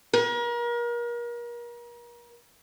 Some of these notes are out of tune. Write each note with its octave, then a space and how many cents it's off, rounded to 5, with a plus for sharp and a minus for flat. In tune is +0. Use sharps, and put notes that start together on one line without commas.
A#4 +35